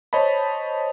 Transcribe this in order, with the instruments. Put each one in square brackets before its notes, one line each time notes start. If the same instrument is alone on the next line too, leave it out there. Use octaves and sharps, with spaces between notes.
[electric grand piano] C5 C#5 D#5 A5 B5